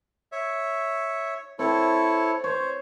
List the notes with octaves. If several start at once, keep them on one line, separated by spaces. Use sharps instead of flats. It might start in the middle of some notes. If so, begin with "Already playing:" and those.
C#5 E5
C4 E4 A4 C#5
C5 C#5